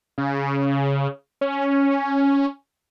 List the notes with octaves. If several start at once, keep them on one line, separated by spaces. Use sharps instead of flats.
C#3
C#4